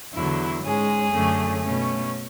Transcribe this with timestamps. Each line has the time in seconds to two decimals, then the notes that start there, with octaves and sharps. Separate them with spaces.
0.13 E2 D3 F#3 E4
0.63 G#2 G#3 C#4 G#4
1.12 F#2 D3 A3 C#4
1.62 B2 A3 C#4